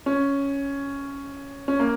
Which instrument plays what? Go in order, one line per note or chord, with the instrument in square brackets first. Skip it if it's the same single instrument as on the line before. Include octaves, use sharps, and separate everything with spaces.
[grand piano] C#4
C#4
A#3